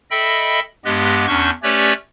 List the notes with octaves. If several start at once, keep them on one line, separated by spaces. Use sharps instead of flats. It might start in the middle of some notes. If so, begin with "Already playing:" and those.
A4 D#5 E5 G5 B5
G2 G#3 B3 G4 D#5 F#6
E2 C#4 D4 C#6 G6
A3 C#4 G4 B4 C#5 D5